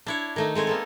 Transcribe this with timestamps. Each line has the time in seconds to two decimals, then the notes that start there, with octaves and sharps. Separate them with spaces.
0.07 D4 E4 C#5
0.36 D#3 A3 D#4
0.55 G#3 A3 C4 C#5
0.67 A#3 B3 A4